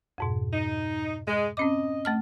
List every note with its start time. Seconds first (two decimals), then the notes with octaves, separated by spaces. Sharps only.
0.18 F2 G#2 B2
0.53 D#4
1.28 G#3
1.57 C4 C#4 D#5 D6
2.05 A3 A5 F6